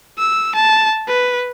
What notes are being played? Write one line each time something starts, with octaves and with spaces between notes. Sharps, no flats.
E6
A5
B4